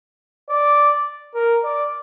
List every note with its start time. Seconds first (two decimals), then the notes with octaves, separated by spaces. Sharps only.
0.49 D5
1.35 A#4
1.64 D5